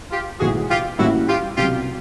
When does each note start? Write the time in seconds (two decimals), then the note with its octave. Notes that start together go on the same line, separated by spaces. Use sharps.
0.11 F4 G4
0.40 B1 A2 E3 G#3 F#4 G#4
0.69 F4 G4
0.98 A2 E3 G3 A#3 C#4 E4 F#4
1.28 F4 G4
1.57 C2 B2 F#3 F4 G4